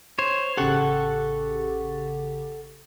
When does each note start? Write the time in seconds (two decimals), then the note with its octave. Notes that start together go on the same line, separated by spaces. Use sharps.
0.19 C5 C#5
0.57 A1 C#3 G4 A4 F#5 C#6